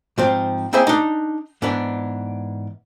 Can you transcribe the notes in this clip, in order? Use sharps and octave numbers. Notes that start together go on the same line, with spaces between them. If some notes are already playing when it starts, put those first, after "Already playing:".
G#2 F3 C4
A#3 C4 E4 G#4 C5 E5
D4 D#4
G#2 E3 B3 D4